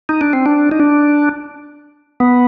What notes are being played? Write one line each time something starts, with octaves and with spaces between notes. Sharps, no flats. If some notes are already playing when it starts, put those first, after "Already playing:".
D#4
D4
C4
D4
D#4
D4
B3